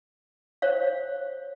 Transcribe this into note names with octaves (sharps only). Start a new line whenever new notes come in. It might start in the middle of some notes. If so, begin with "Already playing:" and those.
C5 C#5 F5